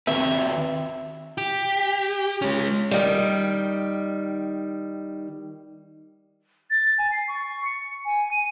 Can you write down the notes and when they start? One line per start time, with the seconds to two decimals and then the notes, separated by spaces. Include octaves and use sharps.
0.07 D#3 C4 B4 E5
1.38 G4
2.42 G#3 C#4
2.91 D#3 G3
6.70 A6
6.98 G#5
7.11 C7
7.28 C#6
7.65 C#7
8.05 G#5
8.31 D#7